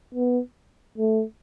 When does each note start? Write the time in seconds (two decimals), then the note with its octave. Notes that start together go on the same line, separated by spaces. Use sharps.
0.14 B3
0.98 A3